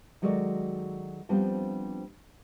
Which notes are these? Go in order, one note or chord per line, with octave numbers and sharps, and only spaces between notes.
D#3 F#3 G#3 F#4 A4 D5
F3 G3 B3 C4 D4 F4